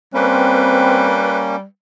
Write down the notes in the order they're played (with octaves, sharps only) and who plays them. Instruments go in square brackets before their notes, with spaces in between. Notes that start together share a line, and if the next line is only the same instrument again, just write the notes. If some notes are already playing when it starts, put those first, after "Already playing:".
[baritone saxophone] G3 [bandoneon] A#3 C#4 [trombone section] C4 [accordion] B4